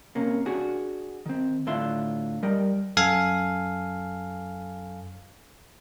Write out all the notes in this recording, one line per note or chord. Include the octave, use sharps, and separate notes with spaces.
C3 A#3 C#4
D4 F#4 G#4
D#3 C4
A2 D3 F4 E5 C6
G3 A#4 D#5 G5
F#2 A4 F5 G#5